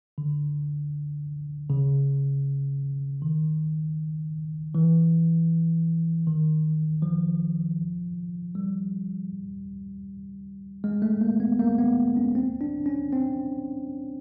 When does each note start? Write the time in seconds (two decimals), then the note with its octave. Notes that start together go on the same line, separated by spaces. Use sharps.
0.18 D3
1.70 C#3
3.22 D#3
4.75 E3
6.27 D#3
7.02 F3
8.55 G3
10.84 G#3
11.02 A3
11.21 A#3
11.40 B3
11.59 A#3
11.78 B3
12.17 C#4
12.35 C4
12.61 D4
12.86 C#4
13.12 C4